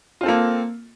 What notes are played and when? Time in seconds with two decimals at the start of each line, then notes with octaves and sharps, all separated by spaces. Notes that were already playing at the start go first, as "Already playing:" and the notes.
0.21 F4
0.23 C4
0.26 A4
0.28 A#3